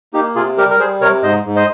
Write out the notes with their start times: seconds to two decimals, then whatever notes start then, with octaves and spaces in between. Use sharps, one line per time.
0.13 A#3 D#4 G4
0.36 C3 F4 G#4
0.57 G3 G4 A#4
0.71 A#4
0.79 G3 G#4 C5
1.01 C3 A#4 C#5
1.23 G#2 C5 D#5
1.45 G#2
1.56 C5 D#5